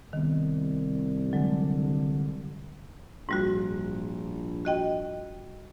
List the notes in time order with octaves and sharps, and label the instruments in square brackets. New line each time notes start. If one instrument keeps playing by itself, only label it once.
[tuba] C2 [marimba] D#3 B3
[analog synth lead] D3 [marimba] F#3 G#3
[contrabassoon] A#1 [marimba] G#2 G3 F#4
[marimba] F#4 D#5 G5